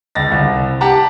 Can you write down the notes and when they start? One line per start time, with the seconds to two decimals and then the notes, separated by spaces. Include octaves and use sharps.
0.15 C#2 A6 A#6
0.32 C2
0.81 G4 F#5 A5 A#5